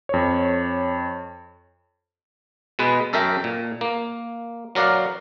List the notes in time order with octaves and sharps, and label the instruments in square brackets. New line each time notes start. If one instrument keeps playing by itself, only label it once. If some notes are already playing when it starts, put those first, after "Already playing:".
[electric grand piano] F2 C#5
[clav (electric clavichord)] B2 G#3 B4
F#2 A4 A#4 E5 G5
A#2
A#3
F#3 A#4 D5 F5 F#5